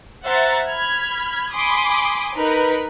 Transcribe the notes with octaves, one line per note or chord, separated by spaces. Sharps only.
C5 E5 F#5 A#5 A6
B5 F6 G#6
G#5 B5 C6 D6 D#6
D#4 A#4 B4 B5